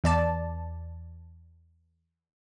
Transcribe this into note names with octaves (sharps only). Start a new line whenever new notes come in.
E2 D5 A5